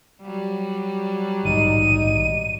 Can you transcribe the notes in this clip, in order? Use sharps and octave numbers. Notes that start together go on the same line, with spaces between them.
F#3 G3
A#1 G#2 D#3 D#4 D#7